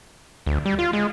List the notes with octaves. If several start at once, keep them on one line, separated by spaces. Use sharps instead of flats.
D2
G3
F4
G#3